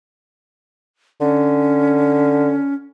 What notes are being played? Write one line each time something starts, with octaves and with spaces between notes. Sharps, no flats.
D3 C#4